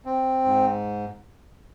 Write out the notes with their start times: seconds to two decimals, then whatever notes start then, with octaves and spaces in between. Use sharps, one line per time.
0.05 C4
0.45 G#2